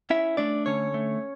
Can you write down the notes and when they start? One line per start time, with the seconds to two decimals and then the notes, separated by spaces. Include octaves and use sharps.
0.10 C#4 E4 E5
0.37 A3 D4 D5
0.66 D3 C#4 C#5
0.94 A3